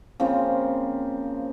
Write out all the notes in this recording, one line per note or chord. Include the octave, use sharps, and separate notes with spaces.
C#3 F3 A#3 C4